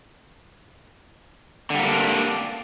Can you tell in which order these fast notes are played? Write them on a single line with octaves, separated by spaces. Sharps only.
D3 G3 A#3 D4